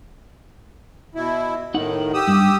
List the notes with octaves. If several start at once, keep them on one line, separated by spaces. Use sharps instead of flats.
B2 E4
A2 D#3 D#4 F#5
G4 D#6 E6
G2